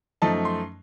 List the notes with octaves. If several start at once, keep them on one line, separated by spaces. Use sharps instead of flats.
F#2 F3 A3 D#4 A5
C6